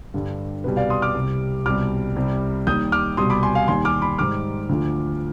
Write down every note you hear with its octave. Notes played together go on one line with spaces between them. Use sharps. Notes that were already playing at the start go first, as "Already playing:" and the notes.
G2 D3 G3
C2 B2 G3 B4
D5 F5
C6 D#6
D6 F6
C2 C3 G3
C2 B2 G3 D6 F6
C2 C3 G3
D#2 D#3 G3 D#6 G6
D6 F6
C2 B2 G3 C6 D#6
B5 D6
G#5 C6
F5 G#5
D#2 D#3 G3 G#5 C6
D6 F6
B5 D6
G#2 D#3 G3 D6 F6
D2 D3 F3